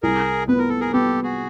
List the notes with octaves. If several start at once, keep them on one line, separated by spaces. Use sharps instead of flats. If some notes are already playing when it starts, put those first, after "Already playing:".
C2 G#4 A#4
B3 B4
A#4
A4
G#4 A#4
B3 G4 A4
F#4 G#4